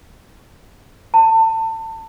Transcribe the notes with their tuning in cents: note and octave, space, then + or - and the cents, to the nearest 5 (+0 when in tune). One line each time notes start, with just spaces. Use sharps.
A5 +30